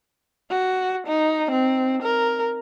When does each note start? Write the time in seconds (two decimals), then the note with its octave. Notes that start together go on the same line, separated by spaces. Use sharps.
0.50 F#4
1.07 D#4
1.52 C4
2.03 A#4